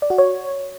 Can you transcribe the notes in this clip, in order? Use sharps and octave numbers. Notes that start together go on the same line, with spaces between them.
D5
F#4
C#5